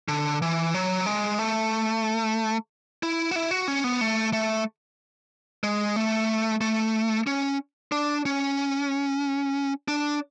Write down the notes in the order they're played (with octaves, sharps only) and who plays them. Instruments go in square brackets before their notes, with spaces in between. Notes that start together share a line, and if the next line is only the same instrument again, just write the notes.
[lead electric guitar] D3
E3
F#3
G#3
A3
E4
F#4
E4
F#4
C#4
B3
A3
A3
G#3
A3
A3
C#4
D4
C#4
D4